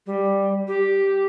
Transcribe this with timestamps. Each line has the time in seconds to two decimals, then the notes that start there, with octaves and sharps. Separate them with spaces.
0.06 G3
0.67 G4